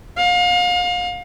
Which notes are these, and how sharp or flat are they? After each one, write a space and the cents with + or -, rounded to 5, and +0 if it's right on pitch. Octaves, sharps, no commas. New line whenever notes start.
F5 +35